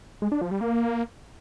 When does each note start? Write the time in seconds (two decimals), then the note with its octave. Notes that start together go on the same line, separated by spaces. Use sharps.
0.22 G#3
0.32 D4
0.41 F3
0.51 G3
0.61 A#3